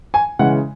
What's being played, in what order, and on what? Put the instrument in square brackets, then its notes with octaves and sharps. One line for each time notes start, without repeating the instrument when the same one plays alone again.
[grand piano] G#5
C#3 E3 G#3 F#5